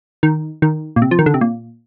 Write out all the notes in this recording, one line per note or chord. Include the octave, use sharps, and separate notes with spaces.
D#3
D#3
A#2
C3
F3
D#3
D3
C3
A#2